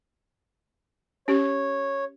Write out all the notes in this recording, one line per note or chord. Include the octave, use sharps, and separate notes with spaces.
C#4 G4 C#5